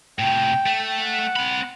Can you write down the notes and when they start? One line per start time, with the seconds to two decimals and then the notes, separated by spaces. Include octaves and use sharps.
0.19 A2 C3 G5
0.66 A3
1.04 F#5
1.36 C4 B5